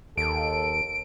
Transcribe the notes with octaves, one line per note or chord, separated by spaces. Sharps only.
D#2 A4 D7